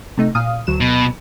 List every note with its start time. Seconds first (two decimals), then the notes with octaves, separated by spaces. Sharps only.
0.17 C3 A3 D#4
0.35 A#2 F5 D#6
0.67 D2 F#3 E7
0.81 B2